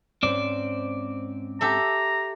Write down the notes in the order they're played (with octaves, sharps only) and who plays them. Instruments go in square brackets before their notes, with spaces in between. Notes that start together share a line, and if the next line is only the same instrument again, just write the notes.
[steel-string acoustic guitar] G#2 C#4 C5 [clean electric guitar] C4 D5
[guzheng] G4 A4 E5 [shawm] A#5